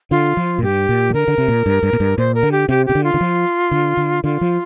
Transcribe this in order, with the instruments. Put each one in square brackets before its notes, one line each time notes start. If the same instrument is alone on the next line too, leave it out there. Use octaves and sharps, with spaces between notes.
[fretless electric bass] D3 [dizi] F4
[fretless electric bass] F3
A#2
[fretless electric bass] G2 [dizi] G4
[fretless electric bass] A#2
F3
[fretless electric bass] D3 [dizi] A#4
[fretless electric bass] D3
C3
A#2
G2
G2
A#2
G2
[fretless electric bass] A#2 [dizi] C5
[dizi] A#4
[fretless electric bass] D3
[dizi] G4
[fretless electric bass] C3 [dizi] G4
[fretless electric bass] C3 [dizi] G4
[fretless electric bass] D3
[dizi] F4
[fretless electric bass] D3
F3
D3
D3
[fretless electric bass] D3 [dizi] F4
[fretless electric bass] F3